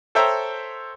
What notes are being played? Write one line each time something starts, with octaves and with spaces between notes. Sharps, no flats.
A4 C5 C#5 E5 G5 A#5